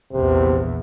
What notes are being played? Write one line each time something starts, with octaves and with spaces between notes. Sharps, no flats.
A#1 E2 C3